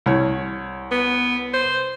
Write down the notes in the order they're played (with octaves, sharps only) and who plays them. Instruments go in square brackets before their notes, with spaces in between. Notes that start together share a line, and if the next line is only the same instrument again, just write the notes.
[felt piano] C2 C#5
[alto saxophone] B3
C5